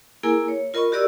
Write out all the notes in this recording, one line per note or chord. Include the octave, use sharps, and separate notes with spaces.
A#3 E4 G#4 A#4 G#5
C#5
F4 A#4 D#5 B5 C#6
F#4 G4 A#4 D5 D#5 E6